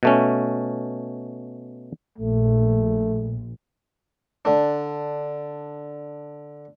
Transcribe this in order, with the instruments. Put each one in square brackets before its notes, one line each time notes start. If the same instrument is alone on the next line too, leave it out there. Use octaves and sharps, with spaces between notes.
[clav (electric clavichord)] B2 A3 C#4
[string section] A#1 [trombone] A3
[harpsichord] D3 D4